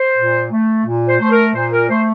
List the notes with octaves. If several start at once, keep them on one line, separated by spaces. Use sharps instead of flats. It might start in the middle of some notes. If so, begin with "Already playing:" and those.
Already playing: C5
A#2
A3
A#2
C5
A3 C5
A#4
A#2 C5
A#4
A3 C5